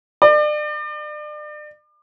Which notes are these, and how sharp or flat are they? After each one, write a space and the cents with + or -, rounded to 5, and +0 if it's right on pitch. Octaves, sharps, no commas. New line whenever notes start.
D5 +35